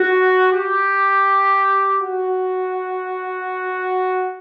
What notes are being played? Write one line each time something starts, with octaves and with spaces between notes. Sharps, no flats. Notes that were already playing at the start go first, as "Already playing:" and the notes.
Already playing: F#4
G4
F#4